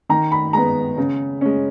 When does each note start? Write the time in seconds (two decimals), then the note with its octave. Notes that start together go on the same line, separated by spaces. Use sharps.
0.09 D#3 A#5
0.32 B5
0.53 G#3 B3 A#5
0.98 C#3
1.41 G#3 C#4